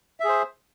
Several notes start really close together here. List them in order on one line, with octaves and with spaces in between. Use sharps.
E5 G#4 C5